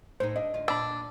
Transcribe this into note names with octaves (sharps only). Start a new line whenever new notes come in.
A2 D#4 C5
D4 D#5
D2 F4
A#2 D4 B5 E6